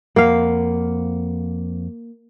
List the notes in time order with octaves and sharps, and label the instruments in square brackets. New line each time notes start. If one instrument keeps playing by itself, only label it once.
[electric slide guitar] F2 F#5 [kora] A#3 F5